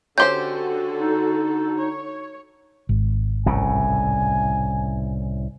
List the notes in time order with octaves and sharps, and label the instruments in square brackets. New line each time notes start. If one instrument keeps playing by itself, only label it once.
[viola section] D3 F#4 A4 [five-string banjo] C#4 G4 C5 [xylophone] C6 G6
[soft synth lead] D#4
[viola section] C#5
[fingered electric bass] G#1
[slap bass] C2 A2 C#3 [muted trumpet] G#5